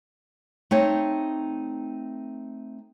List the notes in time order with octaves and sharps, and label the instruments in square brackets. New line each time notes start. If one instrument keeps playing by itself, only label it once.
[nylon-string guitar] A3 C4 D#4 C#5 G5